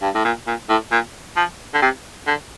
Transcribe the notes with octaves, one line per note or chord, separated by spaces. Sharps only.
G2
A2
A#2
A#2
A2
A#2
F3
D3
C3
D3